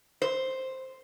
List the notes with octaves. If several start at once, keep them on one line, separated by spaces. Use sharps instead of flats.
C5